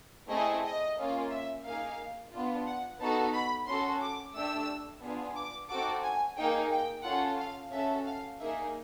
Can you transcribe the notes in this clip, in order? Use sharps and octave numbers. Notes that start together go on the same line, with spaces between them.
A3 C4 E4 G#4 D#5
D#5
A#3 C#4 F4
E5
A#3 D#4 G#4 F5
B3 D4 F4
F#5
B3 D#4 F#4 A4 A5
B5
C#4 F#4 A4 C6
D6
A3 D4 G4 E6
B3 D4 F4 G#4
D6
C4 D#4 F#4 A4 D6
G#5
A#3 D#4 G#4 G5
G5
C#4 F4 A4 F#5
F5
C#4 F#4 A4 E5
F5
A#3 D#4 G#4 E5